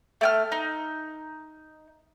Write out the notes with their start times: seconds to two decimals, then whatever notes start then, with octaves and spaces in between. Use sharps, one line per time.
0.21 A3 G5 F6
0.52 D#4